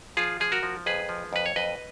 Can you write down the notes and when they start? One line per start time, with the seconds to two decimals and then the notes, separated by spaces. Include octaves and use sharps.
0.17 F3 F4 G#4
0.40 F3 G#4
0.52 F#4 A#4
0.63 F3
0.86 F2 G#4 B4
1.09 F3
1.33 F2 B4
1.46 C#5
1.56 F2 B4 D#5